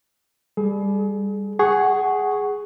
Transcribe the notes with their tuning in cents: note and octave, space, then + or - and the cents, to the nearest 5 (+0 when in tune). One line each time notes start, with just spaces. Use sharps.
G3 +20 G#4 +40
G#4 +0 F#5 +15 C#6 +0